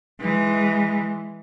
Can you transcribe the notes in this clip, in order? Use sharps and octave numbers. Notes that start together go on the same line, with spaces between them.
E3 G#3